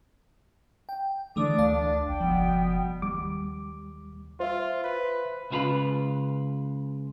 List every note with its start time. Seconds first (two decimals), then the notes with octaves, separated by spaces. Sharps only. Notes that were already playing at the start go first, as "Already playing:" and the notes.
0.89 G5
1.36 D3 E3 A3 D4 D6 D#6
1.58 D2 D5 F5 A5
2.08 A#1 G5
2.20 F#1 B2 F3 G3 B3
3.02 D#2 G3 D6
4.40 F4 C5 E5
4.84 B4
5.50 C#2 C#3 E4 F4 B4 B5